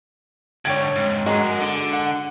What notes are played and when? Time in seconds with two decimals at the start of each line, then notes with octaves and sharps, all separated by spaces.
0.65 G#2 D3 C#5 G5 G#6
0.96 F2 G#2
1.26 G#3 F#4 A#4
1.60 D3
1.93 F#5